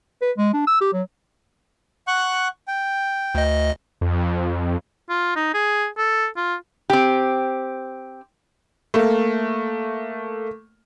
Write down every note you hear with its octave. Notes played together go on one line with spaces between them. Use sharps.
B4
G#3
D4
E6
G4
F#3
F#5 C#6 F#6
G5
D2 D#5
F2
F4
D#4
G#4
A4
F4
C4 G4
A3 A#3